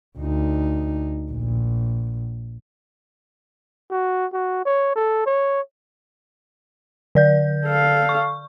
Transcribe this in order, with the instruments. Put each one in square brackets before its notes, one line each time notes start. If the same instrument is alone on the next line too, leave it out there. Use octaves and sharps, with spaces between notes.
[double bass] D2 D#4
A#1
[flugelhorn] F#4
F#4
C#5
A4
C#5
[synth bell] D3 D5 G6
[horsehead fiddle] A4 F5
[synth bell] C#6